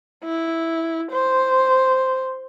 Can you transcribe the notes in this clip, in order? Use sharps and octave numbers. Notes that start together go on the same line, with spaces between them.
E4
C5